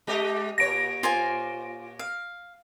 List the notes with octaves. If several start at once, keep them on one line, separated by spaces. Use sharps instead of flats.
G#3 G4 D#5
A#2 C#5 A#6 D7
F4 C5 G#5
F5